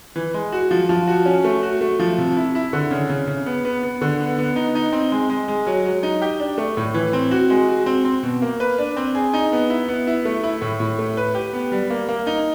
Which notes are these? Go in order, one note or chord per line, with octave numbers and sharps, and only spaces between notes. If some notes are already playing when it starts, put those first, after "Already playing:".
E3
G#3
F#4
F3
F3
F#4
C#4
A3
F#4
A3
F3
C3
E4
E4
D3
C#3
C#3
C#3
B3
B3
B3
D3
B3
B3
D#4
D#4
C4
G#3
G#3
G#3
F#3
F#3
D#4
G4
D4
A3
A2
E3
C4
F#4
G#3
F#4
C4
C4
B2
A#3
B4
D4
C4
G#4
D#4
B3
E4
B3
E4
A3
E4
A2
A2
A3
B4
G4
B3
G3
A#3
A#3
D#4